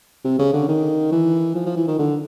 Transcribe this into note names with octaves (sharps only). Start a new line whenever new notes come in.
C3
C#3
D3
D#3
E3
F3
F3
E3
D#3
D3